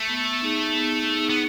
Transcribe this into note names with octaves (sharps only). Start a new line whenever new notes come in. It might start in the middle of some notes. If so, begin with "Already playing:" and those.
Already playing: A3
B3
D#4 G#4
B3
D#4 G#4
B3